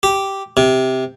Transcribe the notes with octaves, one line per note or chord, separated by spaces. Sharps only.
G4
C3